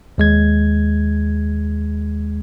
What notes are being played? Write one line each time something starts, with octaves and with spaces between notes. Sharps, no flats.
D#2 G#3 G#6